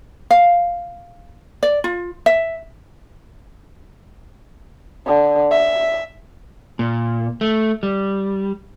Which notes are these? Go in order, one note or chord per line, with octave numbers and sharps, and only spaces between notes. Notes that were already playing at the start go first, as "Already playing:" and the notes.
F5
D5
F4
E5
D3
E5
A#2
A3
G3